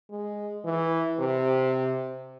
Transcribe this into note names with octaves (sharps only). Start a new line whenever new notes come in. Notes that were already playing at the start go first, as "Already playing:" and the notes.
G#3
E3
C3